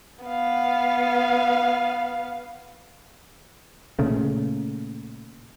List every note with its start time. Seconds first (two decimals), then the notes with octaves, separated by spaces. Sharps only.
0.25 B3 F5
3.99 A#2 C#3 A3